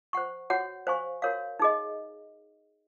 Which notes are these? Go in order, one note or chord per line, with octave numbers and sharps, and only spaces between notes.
C5 F#5 C#6
F#4 C#5 F#5
C5 F5 G#5 C#6
F#4 A#4 C#5 F5
D#4 G#4 D#5